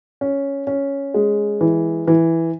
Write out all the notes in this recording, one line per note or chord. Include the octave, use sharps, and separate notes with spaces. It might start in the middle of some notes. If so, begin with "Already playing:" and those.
C#4
C#4
G#3
E3
E3